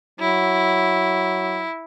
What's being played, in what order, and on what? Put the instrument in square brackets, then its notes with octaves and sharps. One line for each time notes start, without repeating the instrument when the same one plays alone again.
[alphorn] F#3 [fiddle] E4